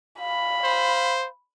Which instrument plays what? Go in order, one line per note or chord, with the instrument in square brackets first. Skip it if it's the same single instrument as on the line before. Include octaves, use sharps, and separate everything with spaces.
[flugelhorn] F5 [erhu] B5
[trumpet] C5